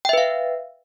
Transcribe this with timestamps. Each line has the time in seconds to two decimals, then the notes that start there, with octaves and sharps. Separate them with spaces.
0.05 G5
0.09 E5
0.13 B4
0.18 F5